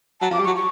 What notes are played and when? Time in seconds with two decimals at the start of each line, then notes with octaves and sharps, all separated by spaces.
0.21 F#3 A5
0.30 F3 D6
0.39 G3
0.44 F#3 C#6
0.56 C#6